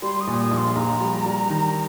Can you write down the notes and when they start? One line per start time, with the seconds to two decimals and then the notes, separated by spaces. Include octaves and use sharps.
0.02 G3 C6
0.21 D#6
0.27 A#2
0.39 D#6
0.51 A#1
0.57 C6
0.76 A#1 A#5
1.00 G3
1.26 G3
1.50 D#3